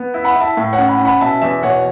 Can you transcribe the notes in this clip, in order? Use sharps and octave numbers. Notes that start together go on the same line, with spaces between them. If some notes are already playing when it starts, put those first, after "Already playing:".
Already playing: B3
E4
F#5 B5
E4
E5 A5
A2
C#5 F#5
C#4
F#5 B5
C#4
F#5 B5
B2 E5 A5
E2 E5
B2 C#5 F#5